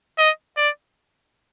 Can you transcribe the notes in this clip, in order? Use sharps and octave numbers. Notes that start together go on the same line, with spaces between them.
D#5
D5